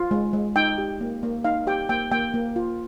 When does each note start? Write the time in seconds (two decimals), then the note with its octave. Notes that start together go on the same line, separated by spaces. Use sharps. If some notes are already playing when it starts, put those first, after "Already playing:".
Already playing: F4
0.11 G#3
0.33 G#3
0.56 D#4 G5
0.78 G4
1.01 A#3
1.23 A#3
1.44 D#4 F5
1.67 G4 G5
1.89 A#3 G5
2.12 A#3 G5
2.34 A#3
2.56 F4